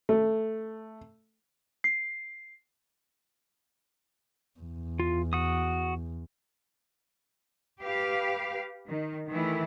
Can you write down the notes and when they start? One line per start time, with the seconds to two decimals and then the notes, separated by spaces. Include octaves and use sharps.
0.09 A3
1.84 C7
4.59 E2
5.00 F4
5.33 F#4 D#6
7.82 G4 B4 F5
8.87 D#3
9.29 D#3 E3 A3 E4